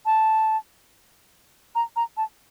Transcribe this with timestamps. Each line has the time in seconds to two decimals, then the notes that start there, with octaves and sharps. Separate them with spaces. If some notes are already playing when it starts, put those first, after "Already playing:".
0.06 A5
1.75 A#5
1.96 A#5
2.17 A5